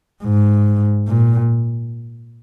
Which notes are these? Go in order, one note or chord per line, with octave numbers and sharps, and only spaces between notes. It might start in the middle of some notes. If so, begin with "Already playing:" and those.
G#2
A#2